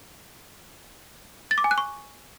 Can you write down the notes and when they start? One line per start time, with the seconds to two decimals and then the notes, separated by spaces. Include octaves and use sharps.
1.51 A6
1.58 D6
1.64 G#5
1.71 F#6
1.78 C#6